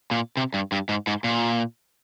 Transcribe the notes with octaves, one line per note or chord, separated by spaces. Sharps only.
A#2
C3
G2
G2
G#2
G#2
A#2